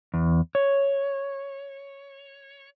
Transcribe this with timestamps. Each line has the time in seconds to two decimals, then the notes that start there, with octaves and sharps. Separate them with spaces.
0.14 E2
0.55 C#5